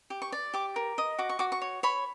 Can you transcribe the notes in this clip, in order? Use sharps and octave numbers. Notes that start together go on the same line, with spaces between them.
G4
C#6
D5
G4 D6
A#4
D#5
F#4 D6
C#6
F#4 D6
C#6
C#5
C#5 B5